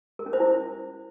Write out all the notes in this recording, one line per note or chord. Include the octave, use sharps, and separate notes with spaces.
A#4
C#4
C5
E4